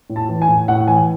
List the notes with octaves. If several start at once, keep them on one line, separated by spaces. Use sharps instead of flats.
A2
A5
E3
G#5
A2
A2 F#5
E3 G#5